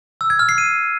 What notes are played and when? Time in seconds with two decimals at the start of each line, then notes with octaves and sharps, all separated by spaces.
0.21 E6
0.30 G#6
0.39 F6
0.49 C7
0.58 D#7